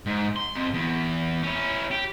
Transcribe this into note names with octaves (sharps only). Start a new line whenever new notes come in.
G#2
C6
F2
E2
C#4 E4
G4